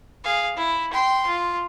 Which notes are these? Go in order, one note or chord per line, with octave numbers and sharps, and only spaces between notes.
G#4 F5
E4
G5 C6
F4